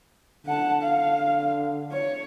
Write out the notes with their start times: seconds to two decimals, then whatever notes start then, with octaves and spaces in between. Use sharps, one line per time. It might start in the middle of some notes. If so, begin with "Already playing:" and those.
0.46 D3 F#5 A5
0.83 F5
1.92 C#5